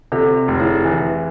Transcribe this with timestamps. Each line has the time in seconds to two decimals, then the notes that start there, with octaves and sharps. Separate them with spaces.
0.12 C3 F4 A4
0.48 F1
0.59 E4 G#4
0.85 E3